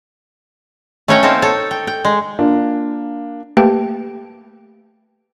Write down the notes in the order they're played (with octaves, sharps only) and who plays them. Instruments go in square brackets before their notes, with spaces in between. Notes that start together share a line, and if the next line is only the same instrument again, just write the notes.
[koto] A3 C#4 B4 C#5 D#5 G5
A#3 C4 D#4 A4
A4 C#5
G5
G5
G#3
[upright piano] A#3 D4 F4
[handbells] A3 A#3 G4 B4 G5 A5